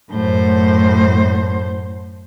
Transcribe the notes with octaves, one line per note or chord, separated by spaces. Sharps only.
F#2 A2 C5